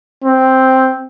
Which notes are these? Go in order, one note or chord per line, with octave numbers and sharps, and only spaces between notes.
C4